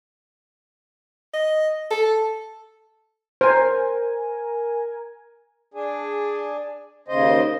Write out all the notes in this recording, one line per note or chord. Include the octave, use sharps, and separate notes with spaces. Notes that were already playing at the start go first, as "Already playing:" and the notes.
D#5
A4
A#4 C5 G#5
D4 G#4
D#2 C#3 C5 D#5